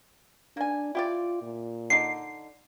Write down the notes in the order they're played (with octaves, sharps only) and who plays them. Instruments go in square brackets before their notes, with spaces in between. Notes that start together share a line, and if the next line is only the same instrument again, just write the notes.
[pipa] A#3 G#5 [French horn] D4
[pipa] E4 G4 D5 [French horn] F4
[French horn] A#2
[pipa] D3 D#4 [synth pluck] C7